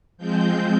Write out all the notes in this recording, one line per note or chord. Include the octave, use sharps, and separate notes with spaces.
F3 G#3 C4 G6